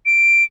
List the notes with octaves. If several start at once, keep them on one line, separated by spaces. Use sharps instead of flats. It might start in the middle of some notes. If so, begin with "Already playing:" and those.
D7